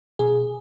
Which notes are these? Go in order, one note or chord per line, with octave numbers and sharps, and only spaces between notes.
B2 G#4